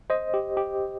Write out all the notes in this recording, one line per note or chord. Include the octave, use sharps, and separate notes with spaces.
C5 D#5
G4
G4